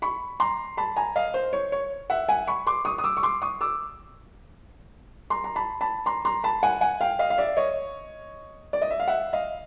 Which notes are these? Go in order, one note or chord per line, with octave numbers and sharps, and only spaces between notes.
B5 C#6
A#5 C6
A5 B5
G#5 A#5
D#5 F5
C5
C#5
C#5
E5 F#5
F#5 G#5
B5 C#6
C6 D6
C#6 D#6
D#6
D6 E6
C#6
C6 D6
C#6 D#6
D6 E6
A#5 C6
A#5
A5 B5
A5 B5
A#5 C6
A#5 C6
A5 B5
F#5 G#5
F#5 G#5
F5 G5
D#5 F5
F5
D5 E5
C#5 D#5
D5
D#5
E5
F5
E5 F#5
D#5 F5